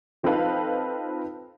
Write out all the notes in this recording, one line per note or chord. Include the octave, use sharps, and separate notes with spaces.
F3 C4 D#4 A4 B4 F5